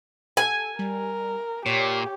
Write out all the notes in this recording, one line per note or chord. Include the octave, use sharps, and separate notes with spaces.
A4 G#5
G3 A#4
A#2 G4 C#5